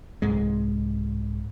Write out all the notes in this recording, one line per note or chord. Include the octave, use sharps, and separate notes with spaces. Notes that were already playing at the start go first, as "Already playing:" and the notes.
C2 G#2 G#3